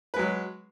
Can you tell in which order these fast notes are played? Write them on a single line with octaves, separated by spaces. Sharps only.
B4 G#3 F#3